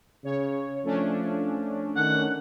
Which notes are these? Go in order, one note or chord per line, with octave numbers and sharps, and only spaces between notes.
C#3 C#5
F3 A3 C#4 D4
D#3 F#5